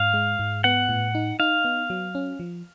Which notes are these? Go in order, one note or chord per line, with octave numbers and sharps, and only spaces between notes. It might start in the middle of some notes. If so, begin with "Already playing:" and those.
Already playing: G#2 F5
G#3
G#2
B3 F#5
A2
D#4
D#4 F5
B3
F#3
C#4
F3